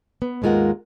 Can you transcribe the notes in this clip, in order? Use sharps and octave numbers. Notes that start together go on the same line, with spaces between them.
B3
D#2 G#2 G#3 F4 A#4 F#5